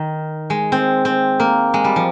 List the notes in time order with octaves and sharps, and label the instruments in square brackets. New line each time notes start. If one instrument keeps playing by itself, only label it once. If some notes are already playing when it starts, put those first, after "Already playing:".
Already playing: [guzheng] D#3
G#3
C4
C4
A#3
G#3
G3
F3